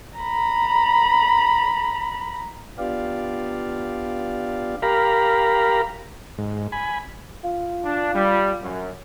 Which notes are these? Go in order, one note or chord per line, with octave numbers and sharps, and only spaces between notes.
A#5 B5
B3 D4 F4 G4 D5 F5
G4 A#4 F5 A#5 B5
G#2
G#5 B5
F4
D4
G3
F#2